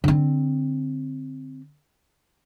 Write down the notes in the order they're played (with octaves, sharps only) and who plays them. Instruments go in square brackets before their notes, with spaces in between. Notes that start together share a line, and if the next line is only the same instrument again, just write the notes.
[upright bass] D3 C4